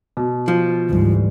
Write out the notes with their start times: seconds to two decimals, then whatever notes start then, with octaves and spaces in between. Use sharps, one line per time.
0.17 B2
0.48 F3
0.90 D2 G#2 E3 G3